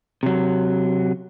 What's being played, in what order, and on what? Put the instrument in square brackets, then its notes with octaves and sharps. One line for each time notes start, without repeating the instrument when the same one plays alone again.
[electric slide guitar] C3 F#3